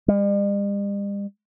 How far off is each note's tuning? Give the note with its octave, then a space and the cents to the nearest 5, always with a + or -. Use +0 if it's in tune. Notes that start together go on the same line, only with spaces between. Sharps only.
G3 +45